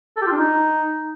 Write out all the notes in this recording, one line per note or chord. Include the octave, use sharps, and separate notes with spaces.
A4
G4
F4
D4
D#4